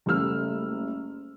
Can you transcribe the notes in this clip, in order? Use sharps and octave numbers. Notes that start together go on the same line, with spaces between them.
F#1 G3 A3 E6 F6